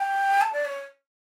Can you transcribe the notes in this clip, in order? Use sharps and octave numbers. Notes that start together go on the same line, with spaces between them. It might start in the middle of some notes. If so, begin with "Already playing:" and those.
Already playing: G5
A5
D5
C#5